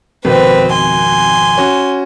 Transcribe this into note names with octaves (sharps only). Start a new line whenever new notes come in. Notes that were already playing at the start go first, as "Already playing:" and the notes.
G#1 F2 B2 C4 B4
G#5 C6
C#4 F#4